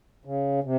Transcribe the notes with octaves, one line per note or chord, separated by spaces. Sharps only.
C#3
C3